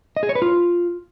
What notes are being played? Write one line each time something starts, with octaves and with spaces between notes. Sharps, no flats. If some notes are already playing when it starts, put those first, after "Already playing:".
D#5
G#4
C#5
B4
F4